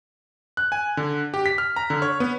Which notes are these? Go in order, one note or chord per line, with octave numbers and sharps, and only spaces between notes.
F#6
G#5
D3
G4
B6
F6
A#5
D3
C#5
B3